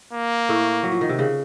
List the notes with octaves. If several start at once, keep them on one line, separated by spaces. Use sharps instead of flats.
A#3
A2 A3
F#3
F3
D#3
C3
C#3